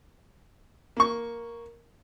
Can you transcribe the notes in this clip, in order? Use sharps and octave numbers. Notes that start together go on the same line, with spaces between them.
A#3 C#6